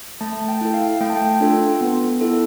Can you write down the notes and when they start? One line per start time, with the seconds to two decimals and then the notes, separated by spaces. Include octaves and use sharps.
0.21 A3 A5
0.40 A5
0.48 G5
0.61 E4 A4
0.74 F5
1.01 A3 G5
1.10 A5
1.17 G5
1.40 D4 F4 A4
1.81 B3
2.21 E4 A4